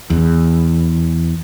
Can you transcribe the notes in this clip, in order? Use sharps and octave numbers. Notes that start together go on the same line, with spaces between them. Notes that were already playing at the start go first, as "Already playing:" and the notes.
E2